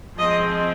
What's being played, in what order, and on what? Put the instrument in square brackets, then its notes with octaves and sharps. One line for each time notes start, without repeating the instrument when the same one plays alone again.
[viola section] F3 G#3 C4 D#5